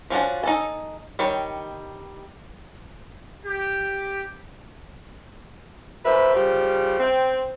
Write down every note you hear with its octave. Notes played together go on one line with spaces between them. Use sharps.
F3 C#4 D4 F#4
D#4 A4 G#5
D#3 G3 C#5
G4
F#2 B4 C5 E5
C#3 F3 G3
C4